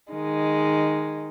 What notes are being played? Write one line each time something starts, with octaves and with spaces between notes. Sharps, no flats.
D#3 G#3